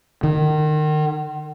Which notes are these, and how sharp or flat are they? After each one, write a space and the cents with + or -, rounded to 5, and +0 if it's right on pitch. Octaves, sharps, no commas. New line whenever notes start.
D#3 -30